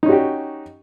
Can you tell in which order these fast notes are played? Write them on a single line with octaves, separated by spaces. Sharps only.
D#4 C#4 F#4 G4